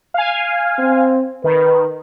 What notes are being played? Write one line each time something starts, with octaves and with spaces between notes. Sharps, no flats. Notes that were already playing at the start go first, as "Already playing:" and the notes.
F5 G#5
C4
D#3 B4